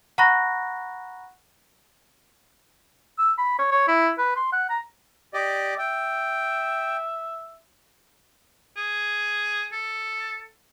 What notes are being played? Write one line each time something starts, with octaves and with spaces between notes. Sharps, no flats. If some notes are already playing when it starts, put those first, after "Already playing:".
F#5 A#5 B5 C#6 F#6 A#6
E6
B5
C#5
C#5
E4
B4
C6
F#5
A#5
G4 D5 D#5
E5 G5
G#4
A4